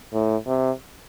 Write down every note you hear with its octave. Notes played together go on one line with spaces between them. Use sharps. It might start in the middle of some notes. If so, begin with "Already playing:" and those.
A2
C3